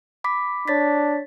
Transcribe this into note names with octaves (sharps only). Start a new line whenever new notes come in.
B5 D6 B6
D4 C#5 A6 B6